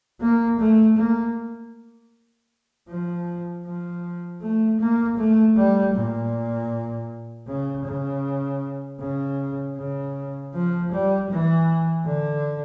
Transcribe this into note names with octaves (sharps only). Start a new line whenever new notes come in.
A#3
A3
A#3
F3
F3
A3
A#3
A3
G3
A#2
C#3
C#3
C#3
C#3
F3
G3
E3
D3